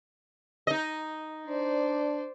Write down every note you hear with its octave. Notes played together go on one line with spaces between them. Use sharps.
D#4 D#5
D4 C5 D5